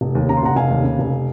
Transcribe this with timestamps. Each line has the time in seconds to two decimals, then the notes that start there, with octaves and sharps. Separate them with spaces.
0.01 F1
0.15 D#2
0.29 C#3 A#5
0.37 C6
0.43 F1 F#5 A#5
0.56 F1 F5 G#5
0.71 D#2
0.84 C#3
0.99 F1